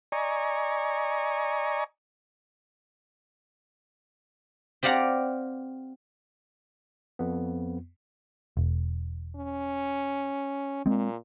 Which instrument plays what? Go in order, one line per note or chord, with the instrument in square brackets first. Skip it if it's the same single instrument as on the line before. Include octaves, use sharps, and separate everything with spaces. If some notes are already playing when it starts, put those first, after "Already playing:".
[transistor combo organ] D5 D#5 G#5 A#5 C#6
[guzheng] C4 G4 D5 F5 F#5 A#5
[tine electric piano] F2 B3
[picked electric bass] E1
[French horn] C#4
[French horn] A#2 [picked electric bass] G#3 C4